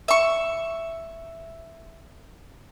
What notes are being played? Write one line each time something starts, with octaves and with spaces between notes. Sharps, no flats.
E5 C#6